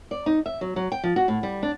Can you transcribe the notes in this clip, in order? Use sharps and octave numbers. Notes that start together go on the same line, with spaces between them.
D5
D#4
E5
F#3
F#3
G5
F3
F#4
A2
G3
D4